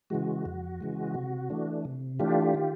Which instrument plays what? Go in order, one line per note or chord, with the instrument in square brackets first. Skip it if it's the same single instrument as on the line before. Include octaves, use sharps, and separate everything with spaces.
[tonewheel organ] C#3 E3 G#3 F#4
F2
C#3 E3 G#3
C3
E3 A3 D4
C3
E3 A3 D4 F4 G4
D#3